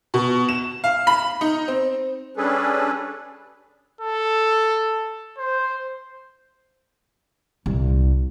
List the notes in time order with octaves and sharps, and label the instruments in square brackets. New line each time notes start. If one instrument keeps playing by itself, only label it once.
[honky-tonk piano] B2
E7
F5
B5
D#4
C4
[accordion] G3 C#4 D4 G#4 A4 B4
[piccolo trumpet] A4
C5
[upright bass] C2